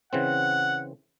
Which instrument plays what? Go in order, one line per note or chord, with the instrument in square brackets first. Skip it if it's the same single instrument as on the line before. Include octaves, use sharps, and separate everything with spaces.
[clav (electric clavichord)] C#3 E3 C4 [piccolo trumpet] F#5